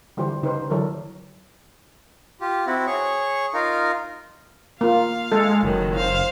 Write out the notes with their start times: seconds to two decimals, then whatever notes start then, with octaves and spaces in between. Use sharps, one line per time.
0.17 D3 E3 G3 G4 C5
0.42 C#3 D#4 G4 B4 C5
0.70 D3 E3 F#3 A4 A#4
2.41 F4 G4
2.66 C4 E4 F#4
2.87 G#4 C#5 C#6
3.54 D#4 F4 A#4 F5
4.81 A#3 F4 F5
5.32 G#3 A4
5.63 F#1 D#3 F#3
5.95 C5 F5